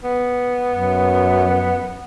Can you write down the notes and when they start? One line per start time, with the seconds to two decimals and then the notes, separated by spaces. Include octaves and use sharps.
0.04 B3
0.71 F#2